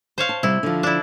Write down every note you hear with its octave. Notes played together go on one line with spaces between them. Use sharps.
C5 C#5 F5
A5
C3 G3 E4
D3 F3
D4 E4